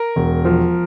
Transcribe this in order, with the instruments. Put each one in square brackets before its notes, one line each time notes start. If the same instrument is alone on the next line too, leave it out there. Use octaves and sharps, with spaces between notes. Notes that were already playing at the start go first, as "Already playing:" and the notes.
Already playing: [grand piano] A#4
E1
F3